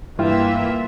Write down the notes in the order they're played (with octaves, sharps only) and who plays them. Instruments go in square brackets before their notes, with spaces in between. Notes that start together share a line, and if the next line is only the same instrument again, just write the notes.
[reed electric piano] G2 E4 G5 [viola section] E3 A#3 E5 [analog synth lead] F4